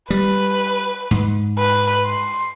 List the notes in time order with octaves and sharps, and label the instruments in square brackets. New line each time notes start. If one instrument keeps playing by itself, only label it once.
[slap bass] G3 [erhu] B4
[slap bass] G#2
[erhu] B4
C6